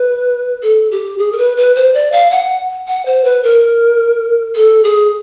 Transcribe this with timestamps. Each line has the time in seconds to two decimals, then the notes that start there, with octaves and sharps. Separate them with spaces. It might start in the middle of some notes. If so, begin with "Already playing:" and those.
Already playing: B4
0.63 A4
0.91 G4
1.19 G#4
1.32 A#4
1.38 B4
1.57 B4
1.76 C5
1.94 D5
2.12 F5
2.31 F#5
2.88 F#5
3.06 C5
3.25 B4
3.43 A#4
4.56 A4
4.84 G#4